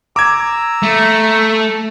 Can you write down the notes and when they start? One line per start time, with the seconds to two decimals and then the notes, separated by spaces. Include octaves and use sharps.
0.16 A#5 D6 E6 G#6
0.83 A3